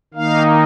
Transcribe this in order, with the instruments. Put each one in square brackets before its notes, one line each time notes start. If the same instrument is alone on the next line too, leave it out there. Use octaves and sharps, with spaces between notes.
[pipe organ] D#3 A#3 D#4 F5